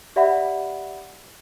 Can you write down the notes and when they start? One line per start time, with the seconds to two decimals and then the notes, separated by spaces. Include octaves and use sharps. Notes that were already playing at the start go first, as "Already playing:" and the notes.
0.16 G4 D5 E5 F#5 B5